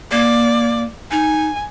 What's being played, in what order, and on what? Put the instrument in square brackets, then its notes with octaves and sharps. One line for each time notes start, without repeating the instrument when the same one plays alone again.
[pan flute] A#3 [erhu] D5
[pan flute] D#4 [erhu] G#5